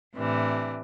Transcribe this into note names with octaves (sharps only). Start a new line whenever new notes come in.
A2 C3 E3 D4